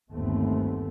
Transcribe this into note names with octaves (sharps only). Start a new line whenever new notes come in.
G1 D#2 A3 B3 C4